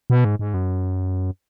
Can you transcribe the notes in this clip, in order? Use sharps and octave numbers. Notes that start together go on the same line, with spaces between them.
B2
G#2
G#2
F#2